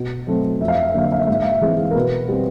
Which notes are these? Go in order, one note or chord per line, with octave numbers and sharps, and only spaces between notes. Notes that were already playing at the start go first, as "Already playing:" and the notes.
Already playing: B2
F#3 A3 C4
F2 E5
F5
E5
F5
E5
D3 F#3 A#3 F5
E5
F5
E5
G#2 F5
E5
F5
E5
E3 G#3 C4
A#4
B2 B4
G3 C4